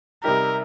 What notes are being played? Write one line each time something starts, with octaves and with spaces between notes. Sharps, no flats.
C3 G3 D#4 G4 A#4